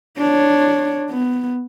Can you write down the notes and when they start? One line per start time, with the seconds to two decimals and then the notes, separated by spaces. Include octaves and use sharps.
0.18 D4 C#5
1.10 B3